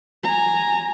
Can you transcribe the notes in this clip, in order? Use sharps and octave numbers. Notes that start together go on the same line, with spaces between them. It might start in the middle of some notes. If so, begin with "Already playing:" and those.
G#5 A#5